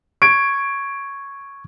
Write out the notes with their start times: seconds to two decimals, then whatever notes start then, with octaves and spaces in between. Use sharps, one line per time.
0.22 C#6 G#6 D7